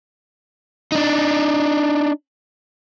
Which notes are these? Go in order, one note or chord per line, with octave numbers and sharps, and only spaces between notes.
D4 D#4